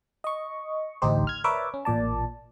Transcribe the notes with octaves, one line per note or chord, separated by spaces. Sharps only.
D#5 C#6
A1 D2 D#4 G4 C5
F6 G#6
A#4 B4 C#5 D5 E5 D6
C#4
A1 A#2 D5 A5